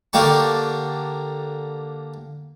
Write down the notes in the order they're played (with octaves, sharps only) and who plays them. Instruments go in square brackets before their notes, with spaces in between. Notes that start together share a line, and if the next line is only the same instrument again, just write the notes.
[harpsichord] D3 A#3 G4 A5 C#6